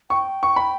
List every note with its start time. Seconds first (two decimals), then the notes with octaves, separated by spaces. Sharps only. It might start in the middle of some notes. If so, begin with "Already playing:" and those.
0.10 G5 C#6
0.43 C#6
0.56 B5